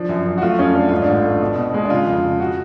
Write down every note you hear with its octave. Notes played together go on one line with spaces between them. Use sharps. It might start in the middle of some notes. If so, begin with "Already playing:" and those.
Already playing: F3 D4
F#2
F#2
F#4
A3 F4
F2 C#4
A3 D4
G#2 F4
D4
A1
A3
B2
B2
G#3
D4
C#3 F4
F2
C#3
F#4